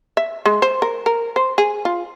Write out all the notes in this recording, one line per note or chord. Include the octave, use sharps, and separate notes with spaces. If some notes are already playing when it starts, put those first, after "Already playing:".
E5
G#3
C5
A#4
A#4
C5
G#4
F4